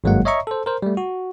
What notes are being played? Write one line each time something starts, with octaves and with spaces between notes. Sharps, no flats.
G#1 G2 F#3 G#3 A#3 F#5
C#5 D#5 E5 A#5 C#6
A4 C5
A#4 C5
G3 A3
F#4